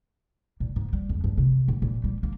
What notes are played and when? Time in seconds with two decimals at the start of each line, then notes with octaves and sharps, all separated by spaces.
0.60 A#2
0.76 G#2
0.93 G3
1.09 F2
1.24 G2
1.38 C3
1.68 A#2
1.82 A#2
2.04 G3
2.23 A#3